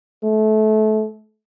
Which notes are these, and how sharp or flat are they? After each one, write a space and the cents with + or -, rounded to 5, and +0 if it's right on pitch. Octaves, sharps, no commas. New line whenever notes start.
A3 -25